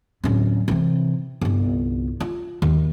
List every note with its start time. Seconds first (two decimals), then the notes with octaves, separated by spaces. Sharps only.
0.24 D1 C#4
0.68 C3 E3
1.41 G1 C2
2.20 F4
2.62 D#2